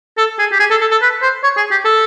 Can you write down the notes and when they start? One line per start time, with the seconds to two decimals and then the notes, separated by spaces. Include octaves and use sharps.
0.18 A4
0.39 G#4
0.52 G4
0.60 G#4
0.71 A4
0.81 A4
0.91 A4
1.02 B4
1.22 C5
1.44 C#5
1.57 G#4
1.71 G4
1.85 A4